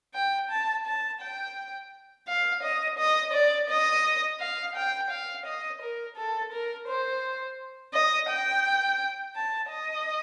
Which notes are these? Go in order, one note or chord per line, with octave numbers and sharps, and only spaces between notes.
G5
A5
A5
G5
F5
D#5
D#5
D5
D#5
F5
G5
F5
D#5
A#4
A4
A#4
C5
D#5
G5
A5
D#5